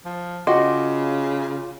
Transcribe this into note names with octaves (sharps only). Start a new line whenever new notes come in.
F3
C#3 F4 F#4 D#5 C6 D6